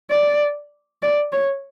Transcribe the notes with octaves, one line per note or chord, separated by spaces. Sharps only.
D5
D5
C#5